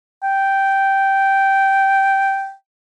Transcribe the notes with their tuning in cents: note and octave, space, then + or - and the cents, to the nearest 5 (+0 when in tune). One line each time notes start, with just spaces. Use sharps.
G5 -10